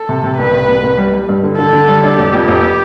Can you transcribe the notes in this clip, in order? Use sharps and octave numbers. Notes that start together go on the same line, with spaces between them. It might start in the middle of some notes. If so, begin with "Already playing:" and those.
Already playing: A4
C3
C3
C2 B4
C3
C2
C2
G3
G3
G2
D3
D3 A4
D3
G3
D4
F1 G4
F2
F1